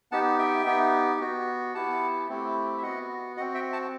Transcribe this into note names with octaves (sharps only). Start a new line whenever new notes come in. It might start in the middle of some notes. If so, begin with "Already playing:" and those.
B3 D#4 G4 F#5 A5
E5 G5
B3 D#4 G4
B3 F#4
B3 E4 G4 F#5 A5
A3 C4 E4 G4
E5
B3 F#4 D#5 F#5
C4 F#4 D#5 F#5
E5 G5
F#5 A5